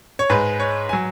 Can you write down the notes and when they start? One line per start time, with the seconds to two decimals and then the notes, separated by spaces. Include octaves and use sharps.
0.19 C#5
0.30 G#2 G#3 B4
0.60 C#5
0.89 G#5
0.93 F#3